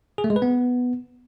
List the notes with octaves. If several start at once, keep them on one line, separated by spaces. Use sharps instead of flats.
G#4
A3
G#3
B4
B3